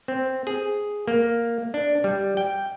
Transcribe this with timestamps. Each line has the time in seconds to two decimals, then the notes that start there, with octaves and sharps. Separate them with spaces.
0.08 C4
0.47 G#4
1.07 A#3
1.74 D4
2.04 G3
2.37 G5